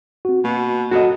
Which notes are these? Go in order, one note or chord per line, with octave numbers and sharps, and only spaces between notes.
C4 F#4
B2 A#3
F#2 F#4 A4 D#5